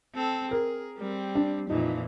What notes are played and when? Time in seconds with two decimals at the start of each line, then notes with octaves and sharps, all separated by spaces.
0.14 C4 A4
0.51 G#4 A#4
0.98 G3 C4
1.35 D4
1.70 F2 A#2 E3 D#4